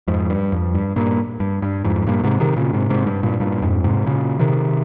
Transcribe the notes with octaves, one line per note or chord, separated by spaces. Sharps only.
F2 G#2
G2
F2
G2
G2 A#2
G2
G2
F2 G#2
G2 A#2
G#2 C3
C3 D#3
A#2 C#3
G#2 C3
G#2 C3
G2
G2 A#2
G2 A#2
F2 G#2
G#2 C3
A#2 C#3
C3 D#3